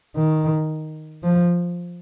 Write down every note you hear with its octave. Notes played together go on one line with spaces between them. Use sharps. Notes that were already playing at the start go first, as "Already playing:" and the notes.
D#3
F3